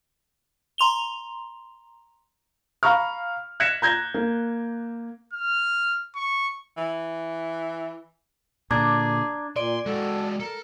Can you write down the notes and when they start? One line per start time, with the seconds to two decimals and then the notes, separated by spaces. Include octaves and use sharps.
0.78 A#5 C6 F7 G7
2.83 F5 A#5 B5 C#6 F6
3.60 F#6 G#6 A#6 B6 C#7 E7
3.82 A#5 G6 G#6 A#6
4.14 A#3
5.33 F6
6.15 C#6
6.77 E3
8.71 A#2 D3 D4 G#4 A#5 D6 G#6
9.56 A#2 D5 C6 D7
9.86 G#3 F#4 A4
10.40 A4 A#4